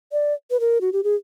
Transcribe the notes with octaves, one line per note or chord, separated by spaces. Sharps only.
D5
B4
A#4
F#4
G4
G#4